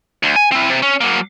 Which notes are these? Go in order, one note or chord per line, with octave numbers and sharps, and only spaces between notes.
D2
G#5
C4 E4
C3
C#4
F#3 A#3